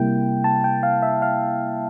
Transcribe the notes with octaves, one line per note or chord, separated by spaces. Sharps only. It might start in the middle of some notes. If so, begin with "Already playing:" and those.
Already playing: C3 G3 A#3 E4 G5
A5
G5
F5
E5
F5